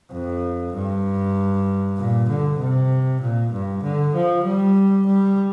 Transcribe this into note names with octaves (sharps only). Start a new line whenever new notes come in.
F2
G2
A#2
D3
C3
A#2
G2
D3
F3
G3
G3